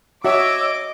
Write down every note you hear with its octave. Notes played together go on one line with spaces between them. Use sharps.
F#4 C#5 D#5 E5 D6 E6